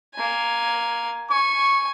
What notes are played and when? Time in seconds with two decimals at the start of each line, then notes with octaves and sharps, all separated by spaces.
0.15 A#3 G#5
1.31 G#5 C#6